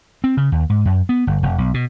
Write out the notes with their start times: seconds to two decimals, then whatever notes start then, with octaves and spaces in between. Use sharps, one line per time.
0.24 C4
0.37 C#3
0.52 D#2
0.70 G#2
0.85 F#2
1.09 B3
1.27 G1
1.43 F1
1.58 B1
1.74 B2